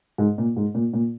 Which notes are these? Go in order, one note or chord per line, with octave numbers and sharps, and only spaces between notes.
G#2
A#2
G#2
A#2
A#2